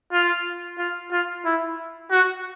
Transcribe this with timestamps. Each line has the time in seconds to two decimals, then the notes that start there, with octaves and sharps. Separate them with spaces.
0.12 F4
0.78 F4
1.11 F4
1.45 E4
2.11 F#4